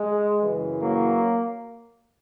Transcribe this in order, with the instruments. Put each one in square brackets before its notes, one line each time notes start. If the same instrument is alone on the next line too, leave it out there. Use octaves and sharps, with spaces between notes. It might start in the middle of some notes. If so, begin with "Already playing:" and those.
Already playing: [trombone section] G#3
F#2 C#3 E3
F#3 A#3